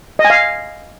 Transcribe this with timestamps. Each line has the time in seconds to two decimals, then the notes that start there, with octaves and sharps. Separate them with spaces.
0.19 D#5
0.25 G#5
0.30 F5